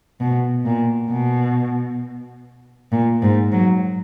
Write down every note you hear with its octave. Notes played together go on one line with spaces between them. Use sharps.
B2
A#2
B2
A#2
G#2
F#3